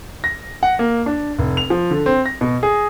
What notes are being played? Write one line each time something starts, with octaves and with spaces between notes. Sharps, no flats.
A#6
F#5
A#3
D4
F1
F7
F3
D3
C4
A#6
B2
G#4